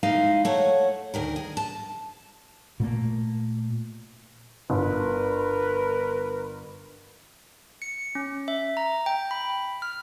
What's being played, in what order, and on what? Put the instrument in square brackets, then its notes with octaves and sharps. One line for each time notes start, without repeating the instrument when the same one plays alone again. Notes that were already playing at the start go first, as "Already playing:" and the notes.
[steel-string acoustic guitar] G#3 A#3 D#4 E4 F5
A3 C#5 F#5
D2 D#3 A#4
G#4
A5
[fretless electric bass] A#2 A3 A#3
[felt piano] G1 [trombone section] A#4 B4
[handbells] C#7
C#4
E5
A#5
G5
B5
F6